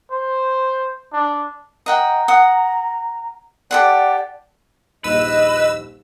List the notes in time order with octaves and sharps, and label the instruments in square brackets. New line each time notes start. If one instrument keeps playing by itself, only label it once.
[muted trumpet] C5
D4
[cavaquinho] D#5 F#5 G5 [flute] A#5
[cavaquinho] F#5 D#6
[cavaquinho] G4 A4 F#5 [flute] D5
[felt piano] D#1 A#1 D#4 [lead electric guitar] B4 [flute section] D#5 [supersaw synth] E6